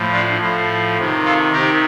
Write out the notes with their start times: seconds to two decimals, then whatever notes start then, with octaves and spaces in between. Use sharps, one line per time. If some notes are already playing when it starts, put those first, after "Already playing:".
Already playing: A2 F3
0.12 D4 F4
0.41 A2 F3
0.97 C3 D#3
1.25 F4 A4
1.53 C3 D#3 G4 A#4